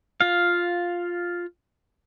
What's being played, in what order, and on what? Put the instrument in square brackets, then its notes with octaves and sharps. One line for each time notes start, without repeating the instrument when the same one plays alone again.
[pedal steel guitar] F4 F5